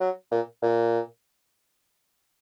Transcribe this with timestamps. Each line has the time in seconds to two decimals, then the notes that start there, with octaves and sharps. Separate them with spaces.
0.01 F#3
0.31 A#2
0.62 A#2